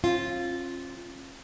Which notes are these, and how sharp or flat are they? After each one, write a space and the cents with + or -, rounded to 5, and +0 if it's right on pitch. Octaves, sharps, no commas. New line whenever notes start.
C#4 -45 F4 +0